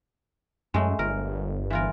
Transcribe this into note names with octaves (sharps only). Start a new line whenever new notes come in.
F#2 G#3 A3
G1 A#4
E3 F4 A#4